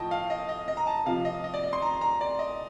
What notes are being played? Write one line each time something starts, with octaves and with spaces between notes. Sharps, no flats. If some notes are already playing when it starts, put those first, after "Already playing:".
Already playing: A2 F3 D#5 G5 A5
F5
D#5
D#5
D#5
A#5
A5
C3 F3 F5
D#5
D#5
D5
D#5
C6
A#5
A#5
D5
D#5